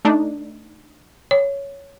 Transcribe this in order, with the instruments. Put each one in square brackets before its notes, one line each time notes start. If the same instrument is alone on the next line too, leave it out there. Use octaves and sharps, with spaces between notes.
[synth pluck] A3 D4 D#4
[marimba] C#5